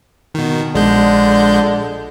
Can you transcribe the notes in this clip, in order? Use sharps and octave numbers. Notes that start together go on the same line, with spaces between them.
B2 D#3
A#1 D3 G#3 G6